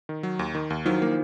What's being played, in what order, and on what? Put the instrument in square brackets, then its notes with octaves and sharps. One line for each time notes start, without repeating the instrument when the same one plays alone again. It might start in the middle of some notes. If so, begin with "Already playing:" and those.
[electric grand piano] D#3
F#3
D#2
D#3
D#2
[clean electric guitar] D#3 F3 [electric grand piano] F#3
[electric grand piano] A#3